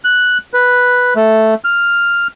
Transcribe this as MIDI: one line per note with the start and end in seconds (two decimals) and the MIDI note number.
0.04 0.38 90
0.54 1.14 71
1.16 1.54 57
1.64 2.27 89